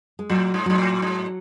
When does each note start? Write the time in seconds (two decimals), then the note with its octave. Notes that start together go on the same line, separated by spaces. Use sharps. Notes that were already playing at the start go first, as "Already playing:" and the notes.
0.19 G#3
0.30 A2 F#3
0.54 G#2
0.66 G#2 F#3
0.78 A2
1.02 G#2